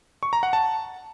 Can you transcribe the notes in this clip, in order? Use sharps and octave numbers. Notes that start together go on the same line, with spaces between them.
C#6
A#5
F#5
A5